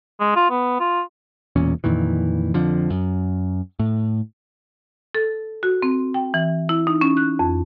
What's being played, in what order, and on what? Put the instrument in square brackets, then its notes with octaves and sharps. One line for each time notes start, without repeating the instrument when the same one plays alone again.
[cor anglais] G#3
F4
B3
F4
[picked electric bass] E1 E2 A#2 C#4
F2 A#2 D#3 E3
F2 D3 F3
F#2
A2
[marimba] A4
F#4
C4
G5
E3
E4
D#4
C#4
F#6
F2